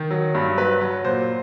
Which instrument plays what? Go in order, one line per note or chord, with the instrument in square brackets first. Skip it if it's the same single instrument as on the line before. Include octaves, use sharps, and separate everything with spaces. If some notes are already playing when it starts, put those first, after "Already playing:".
Already playing: [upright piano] D#3
F#3
G2
F#3 B4
F#3
A#2 C5